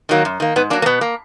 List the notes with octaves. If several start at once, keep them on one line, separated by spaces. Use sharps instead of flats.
D#3 F#3 A#3
F#2
D#3 A#3
G#2 B3
F#3 A#3 D4
A#3
B2 B3
A#3